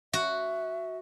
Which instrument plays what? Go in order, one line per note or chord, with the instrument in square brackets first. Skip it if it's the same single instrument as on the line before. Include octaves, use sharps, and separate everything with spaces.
[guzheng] F#4 [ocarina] E5